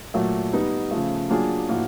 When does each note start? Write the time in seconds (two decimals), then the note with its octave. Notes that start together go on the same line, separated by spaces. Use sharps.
0.14 A#2 F#3 A3
0.53 G3 B3 D#4
0.91 C#3 F3 A3
1.30 F#3 A#3 D4 F4 G#4
1.68 A2 F3 A#3 D4 F#4